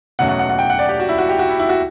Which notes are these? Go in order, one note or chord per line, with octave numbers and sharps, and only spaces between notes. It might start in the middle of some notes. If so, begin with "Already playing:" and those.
E2 B2 F#3 A3 C#4 F#5
F#5
F#5
F#5
G5
F#5
D5
G4
F#4
E4
F#4
G4
F#4
E4
E4
F#4